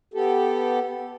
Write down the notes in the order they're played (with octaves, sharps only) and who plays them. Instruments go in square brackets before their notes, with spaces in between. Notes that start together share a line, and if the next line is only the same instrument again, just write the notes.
[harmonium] B3 G4 A4